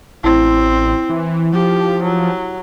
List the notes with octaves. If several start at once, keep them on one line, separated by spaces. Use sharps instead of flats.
A1 C4 E4
E3
F3 G4
F#3